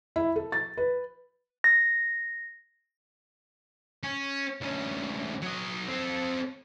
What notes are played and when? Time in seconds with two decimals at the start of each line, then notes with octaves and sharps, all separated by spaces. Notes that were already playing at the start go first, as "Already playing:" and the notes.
0.16 E4
0.36 A4
0.52 A6
0.77 B4
1.64 A#6
4.03 C#4
4.61 D2 C#4
5.42 F#3 D#5
5.88 C4 A4